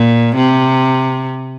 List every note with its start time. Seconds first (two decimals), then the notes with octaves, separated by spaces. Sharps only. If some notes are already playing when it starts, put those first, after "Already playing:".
Already playing: A#2
0.36 C3